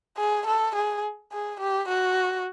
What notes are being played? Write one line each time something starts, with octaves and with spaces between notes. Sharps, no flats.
G#4
A4
G#4
G#4
G4
F#4